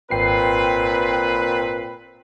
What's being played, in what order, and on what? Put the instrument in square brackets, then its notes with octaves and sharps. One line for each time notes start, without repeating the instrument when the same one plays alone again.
[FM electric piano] G#1 G5 C7 [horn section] A#2 C4 B4